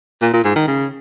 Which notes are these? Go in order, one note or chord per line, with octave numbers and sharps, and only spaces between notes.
A#2
A#2
G#2
D#3
C#3